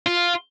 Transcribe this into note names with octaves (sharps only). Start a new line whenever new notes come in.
F4